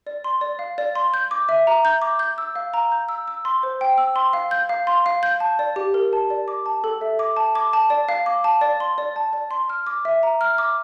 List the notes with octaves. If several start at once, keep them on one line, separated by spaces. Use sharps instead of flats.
D5
C6
D5
F5
D5
C6
G6
D6
E5
A#5
G6
D6
G6
E6
F5
A#5
G6
E6
E6
C6
C5
G5
E6
C6
F5
G6
F5
C6
F5
G6
A5
D5
G4
A#4
A5
D5
D6
A5
A4
E5
D6
A5
D6
A5
D5
F5
D6
A5
D5
C6
D5
A5
D5
C6
F6
D6
E5
A#5
F6
D6